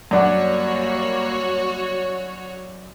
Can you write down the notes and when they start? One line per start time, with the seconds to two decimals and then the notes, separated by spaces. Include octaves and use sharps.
0.11 F#2 G3 A#3 D4 F#4 C#5 F#5